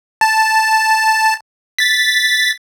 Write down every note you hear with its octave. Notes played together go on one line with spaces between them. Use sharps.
A5
A6 B6